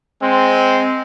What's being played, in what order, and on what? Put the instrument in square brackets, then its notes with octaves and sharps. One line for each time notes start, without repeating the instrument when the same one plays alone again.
[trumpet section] G#3 C4